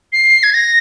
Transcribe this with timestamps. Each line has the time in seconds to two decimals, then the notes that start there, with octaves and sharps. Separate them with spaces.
0.13 C7
0.43 G#6
0.54 A#6